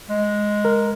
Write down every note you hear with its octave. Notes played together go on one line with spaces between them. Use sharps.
G#3
A#4